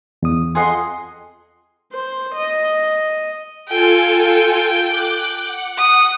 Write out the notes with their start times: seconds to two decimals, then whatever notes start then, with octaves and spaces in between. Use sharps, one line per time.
0.23 E2 D#6
0.55 F2 F4 G#4 D#5 F#5 C6
1.93 C5
2.35 D#5
3.68 F4 A4 G5 G#5
4.88 D6 F#6
5.44 F#5
5.77 D#6